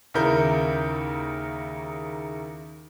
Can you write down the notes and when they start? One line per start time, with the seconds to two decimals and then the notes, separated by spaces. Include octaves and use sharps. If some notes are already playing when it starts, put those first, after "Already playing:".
0.14 D#2 C#3 E4 A#4 G6